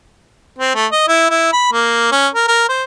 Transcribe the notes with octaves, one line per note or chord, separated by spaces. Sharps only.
C4
A3
D#5
E4
E4
B5
A#3
C#4
A#4
A#4
C5